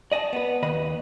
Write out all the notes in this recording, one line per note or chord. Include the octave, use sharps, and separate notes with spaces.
D5 D#5 G#5 A5
B3 B4
D#2 B4 D#5 B5